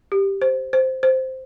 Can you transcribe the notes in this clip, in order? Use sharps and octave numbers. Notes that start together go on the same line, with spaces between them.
G4
C5
C5
C5